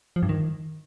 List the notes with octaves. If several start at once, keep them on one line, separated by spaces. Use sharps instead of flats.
F3
G2
D#3